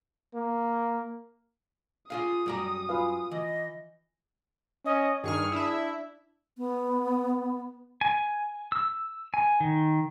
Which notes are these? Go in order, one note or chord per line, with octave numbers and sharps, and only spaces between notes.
A#3
F4 G#4 F5 D#6
F#2 G3 A#5
F4 B4 F5 G#5
E3 D#5
C#4 D#5
G2 D#3 G#4 C#6 F6
D4 E4 E5
B3
G#5
E6
G#5
D#3